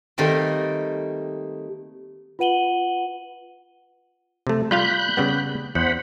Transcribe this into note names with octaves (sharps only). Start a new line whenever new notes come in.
D#3 G3 A3 A#3 C4
F4 B4 F#5 D#7 F#7 G7
C3 A3
G3 F4 F5 B5 F#6 G6
C#3 G3 B3
E2 C5 F#5 B5